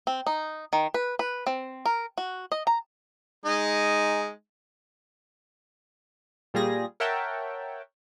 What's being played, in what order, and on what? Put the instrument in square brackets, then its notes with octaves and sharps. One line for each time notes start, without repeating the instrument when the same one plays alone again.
[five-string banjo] C4
D#4
D#3
B4
B4
C4
A#4
F#4
D#5
A#5
[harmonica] G#3 D#4
[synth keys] A#2 G3 F4 G#4 A#6
A#4 C#5 E5 F#5 G5 A5